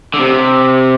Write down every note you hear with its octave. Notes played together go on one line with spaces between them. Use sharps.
D3
C3